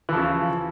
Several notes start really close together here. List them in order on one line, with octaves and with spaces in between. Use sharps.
E3 F3 C#3